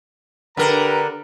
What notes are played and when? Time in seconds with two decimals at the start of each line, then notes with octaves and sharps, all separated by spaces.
0.57 D3 G4 A#4 B4 A#5